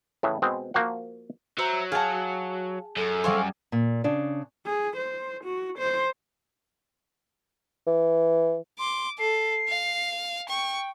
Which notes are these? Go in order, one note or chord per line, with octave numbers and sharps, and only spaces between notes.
A2 C#3 E3
B2 G#3 C4
F3 A#3 F#4 C5 F#5
F#3 C5 E5 A#5
G#4 F5 F#5 A5
F#2 A4
G3 C4 G#4 C#5 F5
A#2
C#3 D4
G#4
C5
F#4
C5
E3
C6 D6
A4 C7
F5
G5 C#6